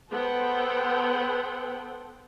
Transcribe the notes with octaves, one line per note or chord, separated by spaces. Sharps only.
B3 A4 C5 F#5 G5